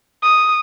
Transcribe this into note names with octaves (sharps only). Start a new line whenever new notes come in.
D#6